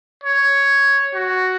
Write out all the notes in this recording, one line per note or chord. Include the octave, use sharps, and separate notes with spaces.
C#5
F#4